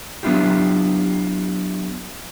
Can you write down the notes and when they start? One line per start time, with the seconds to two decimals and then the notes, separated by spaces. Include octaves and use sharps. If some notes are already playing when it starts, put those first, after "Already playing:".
0.23 F#3 B3 D4 E4 F4 G4